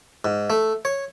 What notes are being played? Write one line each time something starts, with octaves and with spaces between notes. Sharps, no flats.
G#2
A3
C#5